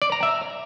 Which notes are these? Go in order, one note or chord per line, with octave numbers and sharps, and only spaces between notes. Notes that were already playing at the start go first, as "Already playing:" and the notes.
D5
A#5
E5